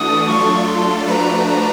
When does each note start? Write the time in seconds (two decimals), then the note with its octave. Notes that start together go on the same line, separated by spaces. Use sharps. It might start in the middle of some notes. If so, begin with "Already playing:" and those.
Already playing: E3 A3 D4 F#4 A4 D#6
0.28 F#3 A3 D4 F4 A4 C#6
0.67 C6
1.07 F3 A3 D4 F#4 B4 A#5 B5
1.47 A#5